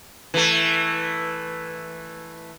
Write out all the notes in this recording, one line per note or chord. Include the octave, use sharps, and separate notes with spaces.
E3 A3